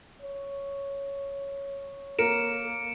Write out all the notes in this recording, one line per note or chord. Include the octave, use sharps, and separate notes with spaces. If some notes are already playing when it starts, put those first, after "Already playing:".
C#5
A#3 A#4 C#7 D7 E7